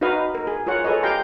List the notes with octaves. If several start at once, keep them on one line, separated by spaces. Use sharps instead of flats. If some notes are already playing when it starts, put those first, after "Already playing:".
D#4 F#4 B4 D#5 F5
A#4
G#4
F4 G#4 A#4 C#5 F#5
G#4 A4 B4 C#5 D#5
G4 D#5 F5 G5 A#5 C6